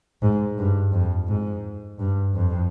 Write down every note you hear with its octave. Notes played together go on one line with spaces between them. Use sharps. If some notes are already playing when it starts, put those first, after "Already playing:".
G#2
G2
F2
G#2
G2
F2